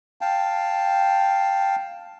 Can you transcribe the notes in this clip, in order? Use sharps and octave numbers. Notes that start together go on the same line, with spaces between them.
F5 G5 A5